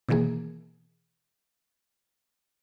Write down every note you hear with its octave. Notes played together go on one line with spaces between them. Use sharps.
B2 D#3 E3 A#3 G#4